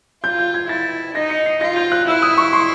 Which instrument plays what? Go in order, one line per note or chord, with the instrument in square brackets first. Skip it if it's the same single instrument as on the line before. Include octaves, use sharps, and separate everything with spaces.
[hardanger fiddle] F4 [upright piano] G6
[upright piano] G6
G#6
[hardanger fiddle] E4 [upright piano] A6
[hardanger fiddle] D#4 [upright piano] A#6
[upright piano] C#7
C7
[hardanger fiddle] F4 [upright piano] A#6
[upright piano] G6
F#6
[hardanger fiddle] E4 [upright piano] E6
[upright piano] D#6
C#6
C6